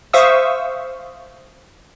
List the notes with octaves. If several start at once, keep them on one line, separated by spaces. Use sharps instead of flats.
C5 E5 F5 C#6 D#6 E6